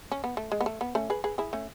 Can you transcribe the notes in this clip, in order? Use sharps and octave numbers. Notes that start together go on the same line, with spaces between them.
C#4
B3
A3
G#3
B3
A3
B3
A3 C#4
G#4 B4
G#4 B4
E4 G#4
A3 C#4